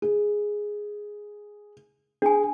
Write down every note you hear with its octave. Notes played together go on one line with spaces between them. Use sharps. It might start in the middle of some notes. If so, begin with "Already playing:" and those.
G#4
D4 G#4 G#5